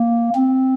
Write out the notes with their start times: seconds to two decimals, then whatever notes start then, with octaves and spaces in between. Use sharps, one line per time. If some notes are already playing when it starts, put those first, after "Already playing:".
Already playing: A#3
0.35 C4